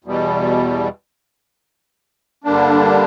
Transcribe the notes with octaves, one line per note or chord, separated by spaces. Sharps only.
E2 B2 G3
G2 D3 G3 A#3 D4